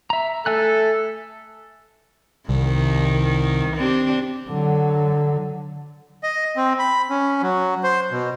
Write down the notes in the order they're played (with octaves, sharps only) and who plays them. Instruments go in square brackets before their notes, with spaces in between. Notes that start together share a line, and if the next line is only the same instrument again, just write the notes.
[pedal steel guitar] E5 A#5
[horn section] A3 A4 [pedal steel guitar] E5 G#5 F#6
[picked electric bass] C2 [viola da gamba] D#3
[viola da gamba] C4 D4 G4
[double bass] D3 F#3
[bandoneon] D#5
C4
B5
C#4
F#3
C5
B2